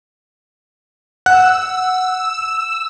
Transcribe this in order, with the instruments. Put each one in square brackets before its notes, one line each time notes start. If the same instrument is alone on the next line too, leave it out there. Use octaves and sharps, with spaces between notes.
[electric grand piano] F#5 F#6 [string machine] E6